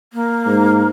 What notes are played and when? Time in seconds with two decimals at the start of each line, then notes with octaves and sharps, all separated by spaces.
0.13 A#3
0.46 G#2